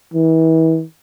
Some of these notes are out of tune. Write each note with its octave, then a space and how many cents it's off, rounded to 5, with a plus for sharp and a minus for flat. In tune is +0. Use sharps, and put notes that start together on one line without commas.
E3 -35